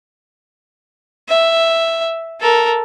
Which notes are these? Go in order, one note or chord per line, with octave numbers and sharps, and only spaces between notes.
E5
A4 A#4